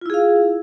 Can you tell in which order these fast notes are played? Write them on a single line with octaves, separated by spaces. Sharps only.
F4 E4 G#4 F5